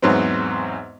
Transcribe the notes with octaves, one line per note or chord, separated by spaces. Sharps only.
E2 G#2 F#3 B3 C4